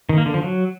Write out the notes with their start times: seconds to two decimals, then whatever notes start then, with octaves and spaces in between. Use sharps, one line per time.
0.09 D#3
0.18 A#3
0.26 D3
0.34 F3
0.42 F#3